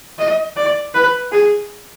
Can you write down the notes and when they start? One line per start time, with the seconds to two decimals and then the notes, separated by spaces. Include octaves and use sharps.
0.18 D#5
0.57 D5
0.94 B4
1.32 G#4